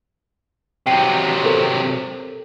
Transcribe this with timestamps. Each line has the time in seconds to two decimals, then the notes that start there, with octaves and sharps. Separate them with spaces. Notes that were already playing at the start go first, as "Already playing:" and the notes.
0.86 C3 F#3 G5 C7 D#7
1.44 A4 A#4 C5